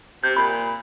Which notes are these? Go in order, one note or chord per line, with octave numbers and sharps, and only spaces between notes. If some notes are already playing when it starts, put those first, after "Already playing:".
C3 G6
A#2 B5